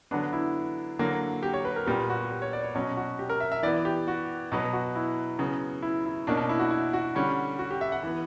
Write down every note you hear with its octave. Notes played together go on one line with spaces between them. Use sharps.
D3 F#3 B3 D4
E4
D3 F#3 A#3
G4
C#5
B4
A#4
A#2 G3 B3 G4
F#4
G4
C#5
D5
C#5
B2 F#3 C#4
F#4
G4
A#4
E5
E5
E3 B3 D5
G4
F#4
B2 F#3 B3
F#4
E4
C#3 F#3 B3
E4
E4
B2 A#3 C#4 D4
D4
E4
F#4
E4
F#4
D3 G3 C#4
F#4
G4
E5
F#5
E3 B3